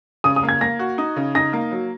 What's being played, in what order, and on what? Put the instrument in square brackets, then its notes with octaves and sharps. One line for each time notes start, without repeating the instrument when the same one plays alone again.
[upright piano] C#3 [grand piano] D#6
[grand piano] D#6
[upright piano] A#3
[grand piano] G#6
[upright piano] A#3 [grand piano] A#6
[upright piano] F#4
D#4
C#3
[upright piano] D#4 [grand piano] A#6
[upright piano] A#3
F#3